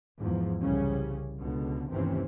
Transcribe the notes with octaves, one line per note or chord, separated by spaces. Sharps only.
E2 G#2 F3
C2 C#3 G3 C#4
C#2 B2 D3
G1 D#2 C3 E3 C4 C#4